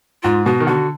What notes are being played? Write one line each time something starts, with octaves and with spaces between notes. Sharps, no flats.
G#2 F4
B2 F#4
D#3
D3 F#4